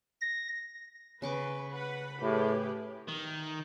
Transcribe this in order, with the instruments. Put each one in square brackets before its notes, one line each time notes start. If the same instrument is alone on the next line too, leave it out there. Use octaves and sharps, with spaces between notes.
[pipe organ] A#6
[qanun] C#3 C#6 D6 [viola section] B4
[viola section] B4 F#5 B5
[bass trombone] A2 [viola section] G4 G#4 B4
[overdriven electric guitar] D#3